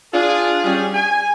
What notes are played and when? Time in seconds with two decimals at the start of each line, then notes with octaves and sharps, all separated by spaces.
0.14 D4 F4 G#4
0.64 G3 C#4 G#4
0.94 G#5